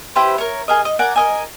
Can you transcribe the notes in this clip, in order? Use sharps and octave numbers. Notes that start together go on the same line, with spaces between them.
E4 G4 B4 C5
A#4 C#5
G#4 A#4 D#5
D#5
A#4 D5 F#5 G#5
A#4 D#5 G#5